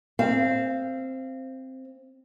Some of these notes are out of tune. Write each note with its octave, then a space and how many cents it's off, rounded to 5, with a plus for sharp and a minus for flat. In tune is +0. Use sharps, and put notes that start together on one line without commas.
C4 +0 F5 -20